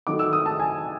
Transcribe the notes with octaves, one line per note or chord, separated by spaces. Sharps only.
D#3 F#3 A3 D6
E6
D#6
A5
G#5